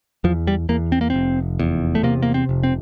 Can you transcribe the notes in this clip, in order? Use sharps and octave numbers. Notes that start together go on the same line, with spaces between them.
E2 F3
G3
E2 A#3
C4
A#3
F1 C4
E2
A3
C3 A#3
A#3
C4
F1
C4